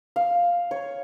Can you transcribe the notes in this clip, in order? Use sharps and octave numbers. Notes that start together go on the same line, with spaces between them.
F5
C#5